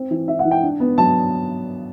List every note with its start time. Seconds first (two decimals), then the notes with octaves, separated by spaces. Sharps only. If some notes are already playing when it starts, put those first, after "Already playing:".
Already playing: C4
0.11 E3
0.28 E3 E5
0.39 F#5
0.45 E3
0.51 G5
0.63 D4
0.80 B3
0.98 F#3 A5